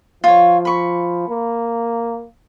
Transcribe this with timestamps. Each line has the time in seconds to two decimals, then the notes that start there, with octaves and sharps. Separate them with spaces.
0.24 F3 F4 C#5
0.65 B5 C#6
1.29 A#3